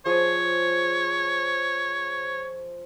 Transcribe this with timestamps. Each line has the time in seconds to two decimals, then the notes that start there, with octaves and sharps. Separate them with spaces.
0.06 F3 G#4 C#5 G#5